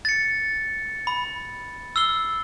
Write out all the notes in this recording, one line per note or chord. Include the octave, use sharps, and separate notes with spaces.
A6 C#7
B5
E6 F6 C7 G7